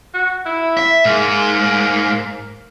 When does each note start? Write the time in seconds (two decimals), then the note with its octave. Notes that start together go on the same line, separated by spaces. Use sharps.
0.14 F#4
0.46 E4
0.77 E5
1.05 G#2 A#3